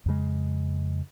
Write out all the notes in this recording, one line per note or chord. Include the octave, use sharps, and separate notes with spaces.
F2 C#3 G#3